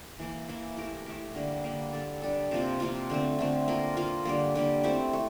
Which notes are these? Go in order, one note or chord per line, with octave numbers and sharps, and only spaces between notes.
E3 A#3 E4
E3 A#3 E4
A3 E4 G4 A#4
A3 E4 G4 A#4
D3 G3 A#3
D3 G3 A#3
G3 D4 A4
G3 D4 A4
C3 F3 A#3 F4
C3 F3 A#3 F4
D3 A3 C4
D3 A3 C4
A#3 F4 A#4
A#3 F4 A#4
D3 G3 A#3
D3 G3 A#3
A3 C4 E4 G4
A3